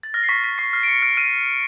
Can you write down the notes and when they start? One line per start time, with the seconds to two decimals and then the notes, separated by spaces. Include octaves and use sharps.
0.03 A6
0.14 F6 A#6
0.23 C7
0.29 C#6 B6
0.44 C#6 B6
0.58 C#6 C7
0.73 F6 C7
0.83 D7
0.88 C#6 C#7
1.02 F6 D7
1.17 F6 D#7